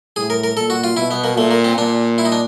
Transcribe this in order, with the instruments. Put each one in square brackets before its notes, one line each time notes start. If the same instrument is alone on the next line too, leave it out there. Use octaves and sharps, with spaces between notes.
[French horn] A2 [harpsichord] G#4
[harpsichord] A#4
A#4
[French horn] A#2 [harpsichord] A4
[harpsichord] F#4
F4
[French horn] B2 [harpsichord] E4
[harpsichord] B3
A#3
[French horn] A#2 [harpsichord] A3
[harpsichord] A#3
C4
[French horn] A#2 [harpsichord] D4
[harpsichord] E4
D#4
D4